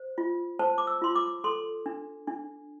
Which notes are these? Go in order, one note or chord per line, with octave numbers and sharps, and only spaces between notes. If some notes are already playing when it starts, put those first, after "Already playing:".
Already playing: C5
F4
C5 A5
D6
E6
F4 C6
D6
A4 C6
D4
D4